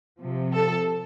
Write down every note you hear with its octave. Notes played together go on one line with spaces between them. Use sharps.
C3 F3
A4